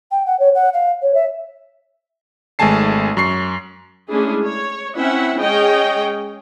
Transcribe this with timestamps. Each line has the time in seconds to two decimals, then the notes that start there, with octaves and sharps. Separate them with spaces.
0.11 G5
0.26 F#5
0.39 C#5
0.54 F#5
0.73 F5
1.02 C#5
1.14 E5
2.59 G#1 G#3 A3 G#5 A5 C7
3.17 F#2 C#6 C7
4.09 G#3 A3 C#4 D4 E4 G#4
4.44 C#5
4.96 C4 C#4 E4 E5 F#5
5.40 G#3 C#4 G#4 C#5 D#5 G5